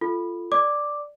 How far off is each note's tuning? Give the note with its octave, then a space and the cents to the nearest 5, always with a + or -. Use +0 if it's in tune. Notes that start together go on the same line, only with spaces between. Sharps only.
F4 -15 A4 +0
D5 +0 D6 +0